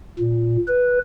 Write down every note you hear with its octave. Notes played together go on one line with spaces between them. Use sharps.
A#2
B4